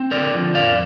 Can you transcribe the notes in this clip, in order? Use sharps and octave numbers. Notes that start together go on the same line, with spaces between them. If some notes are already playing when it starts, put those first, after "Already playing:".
Already playing: C4
D3 A#4 D5
F3
F2 D5 F5